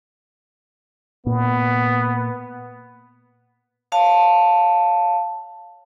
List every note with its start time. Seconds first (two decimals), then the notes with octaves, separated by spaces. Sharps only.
1.26 A#2 B3
3.92 C#5 F5 A5